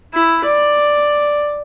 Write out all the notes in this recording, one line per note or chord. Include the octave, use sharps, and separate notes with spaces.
E4
D5